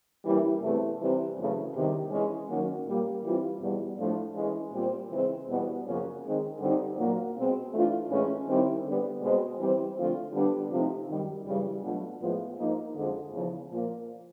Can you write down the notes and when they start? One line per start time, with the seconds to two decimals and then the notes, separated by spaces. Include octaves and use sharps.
0.24 E3 G3 A#3 C#4 E4
0.61 E2 C3 E3 A3 C4
0.99 C3 E3 G3 C4
1.37 F#2 C#3 E3 A3 C#4
1.74 E2 C3 D#3 G3
2.11 E3 G#3 C#4
2.48 D#3 F#3 A#3 C#4
2.86 A#2 G3 A#3
3.23 E3 G3 C4 F4
3.60 E2 B2 G3
3.98 A2 F3 A3 D4 F4
4.36 E3 G#3 C#4
4.72 A#2 G3 C4 F4
5.10 C#3 E3 G#3 C4
5.47 E2 B2 G3 B3
5.85 F#2 C#3 F3 A#3 C#4
6.23 D#3 G#3 C4
6.59 G2 D3 G3 C4 D#4
6.97 A#2 F#3 A#3
7.34 B2 G#3 C4
7.72 E3 A3 D4 F4
8.09 A2 E3 G#3 C#4
8.47 D#3 G3 C4 E4
8.84 D3 G3 B3
9.21 B2 G#3 C4
9.58 E3 G3 C4
9.96 D3 F3 A3 C4 F4
10.33 D3 G3 B3 D4
10.70 C3 F3 A3 C4 D#4
11.08 F#2 D#3 G3
11.45 F#2 C#3 E3 G3
11.82 B2 F#3 A3 D4 F4
12.20 A2 F3 G#3 B3 E4
12.58 G#2 F3 A#3 D#4
12.95 F2 D3 F3 G#3
13.32 E2 C#3 F3
13.69 A#2 F3 A#3